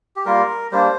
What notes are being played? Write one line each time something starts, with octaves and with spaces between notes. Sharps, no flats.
G4
G3 A#3 F4 A#4
G3 A#3 D4 C5